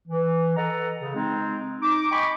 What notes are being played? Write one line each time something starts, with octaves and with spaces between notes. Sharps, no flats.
E3
A4 B4 D#5 F#5 A#5
C#3
G#3 C4 D#4
D#4 D6
D#5 G5 G#5 B5 C#6 D6